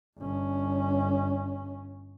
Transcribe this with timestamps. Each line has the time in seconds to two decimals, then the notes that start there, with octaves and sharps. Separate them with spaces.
0.18 G1 C#4